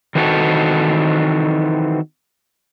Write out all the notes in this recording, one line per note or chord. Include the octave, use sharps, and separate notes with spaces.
D#3 E3 C4 F#4 A4